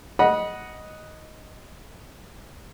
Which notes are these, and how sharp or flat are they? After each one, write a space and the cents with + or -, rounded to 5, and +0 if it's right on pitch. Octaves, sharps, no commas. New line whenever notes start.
D#5 +0 F#5 +0 B5 -25